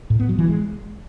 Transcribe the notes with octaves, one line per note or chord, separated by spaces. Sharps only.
A2
B3
F#3
E3
G#3